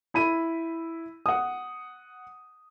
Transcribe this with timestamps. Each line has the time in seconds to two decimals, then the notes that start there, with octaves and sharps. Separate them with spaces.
0.14 E4 B5 D#7
1.26 F#5 D#6